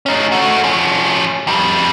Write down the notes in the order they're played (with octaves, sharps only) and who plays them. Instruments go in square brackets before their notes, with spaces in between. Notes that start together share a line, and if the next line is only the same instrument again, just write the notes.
[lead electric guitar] C#4 D#4
A3 F#4
F3 C#4
F2 G3